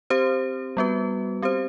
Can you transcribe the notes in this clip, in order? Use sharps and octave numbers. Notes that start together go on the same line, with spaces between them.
C4 G4 C5
G3 B3 F#4 B4
C4 G4 C5